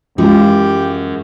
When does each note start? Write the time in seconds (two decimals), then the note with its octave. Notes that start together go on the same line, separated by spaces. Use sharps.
0.18 F#2 E3 G#3 C#4 F4 G4